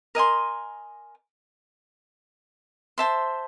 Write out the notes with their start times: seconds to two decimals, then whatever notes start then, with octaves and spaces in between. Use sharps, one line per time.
0.15 A#4 D#5 G#5 C6
2.98 C5 E5 A5 C6